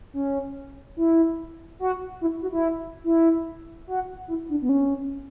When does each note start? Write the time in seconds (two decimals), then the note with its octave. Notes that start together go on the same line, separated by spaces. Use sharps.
0.14 C#4
0.97 E4
1.79 F#4
2.21 E4
2.42 F#4
2.52 E4
3.04 E4
3.87 F#4
4.28 E4
4.49 D4
4.62 B3
4.69 C#4